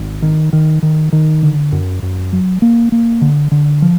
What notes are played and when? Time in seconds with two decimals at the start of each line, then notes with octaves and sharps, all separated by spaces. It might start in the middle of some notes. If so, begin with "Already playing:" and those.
Already playing: G#1
0.22 D#3
0.53 D#3
0.82 D#3
1.13 D#3
1.42 D3
1.72 F#2
2.03 F#2
2.33 F#3
2.62 A#3
2.92 A#3
3.22 D3
3.51 D3
3.82 F3